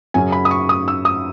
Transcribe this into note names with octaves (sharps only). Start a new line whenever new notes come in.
F#2 C#3 F#3 C#4 G#5
B5
D#6
C#6
D#6
E6
D#6